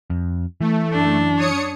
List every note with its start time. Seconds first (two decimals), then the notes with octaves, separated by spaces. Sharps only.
0.10 F2
0.61 E3 A3
0.92 F#2 D4
1.37 C#5 D#6 C#7